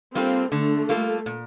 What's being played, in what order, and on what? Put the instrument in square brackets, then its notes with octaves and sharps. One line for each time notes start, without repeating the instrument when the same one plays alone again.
[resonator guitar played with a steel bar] G3 A#3 F4 A4 [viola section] C4
[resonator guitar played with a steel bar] D3 [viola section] A3
[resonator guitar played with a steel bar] G3 A#3 F4 A4
A#2